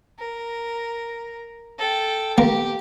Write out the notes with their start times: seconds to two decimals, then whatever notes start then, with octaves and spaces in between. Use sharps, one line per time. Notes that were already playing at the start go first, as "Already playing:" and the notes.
0.19 A#4
1.78 A4 G5
2.38 A#3 G4